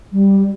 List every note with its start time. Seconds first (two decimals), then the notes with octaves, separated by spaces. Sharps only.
0.12 G3